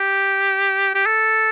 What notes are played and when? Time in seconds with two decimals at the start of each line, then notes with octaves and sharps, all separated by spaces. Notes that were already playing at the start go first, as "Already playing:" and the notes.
Already playing: G4
0.95 G4
1.06 A4